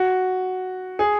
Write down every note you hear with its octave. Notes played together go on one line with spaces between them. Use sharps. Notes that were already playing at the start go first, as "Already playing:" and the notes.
Already playing: F#4
G#4